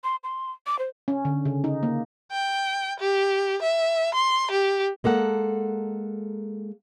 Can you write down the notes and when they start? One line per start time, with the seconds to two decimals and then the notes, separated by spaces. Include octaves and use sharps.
0.04 C6
0.24 C6
0.67 D6
0.79 C5
1.08 C#4
1.25 D3
1.45 C#3
1.64 D#4
1.83 A#3
2.32 G5
3.00 G4
3.62 E5
4.14 C6
4.51 G4
5.04 G#3 A#3 A4 F#5